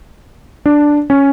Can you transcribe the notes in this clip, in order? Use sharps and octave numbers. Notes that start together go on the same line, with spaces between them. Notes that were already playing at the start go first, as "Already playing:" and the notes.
D4
C#4